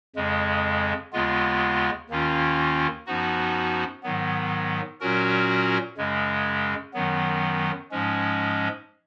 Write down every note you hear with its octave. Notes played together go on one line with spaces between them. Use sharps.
F2 C#3 G#3
D#2 C#3 G#3 B3 F4
D#2 D#3 A#3 C#4 F4
F#2 F3 B3 D#4 F#4
G#2 D#3 F#3 B3
A#2 F#3 C#4 F#4 A#4
F#2 C#3 G#3
F#2 D#3 F#3 B3
G#2 F3 G#3 C#4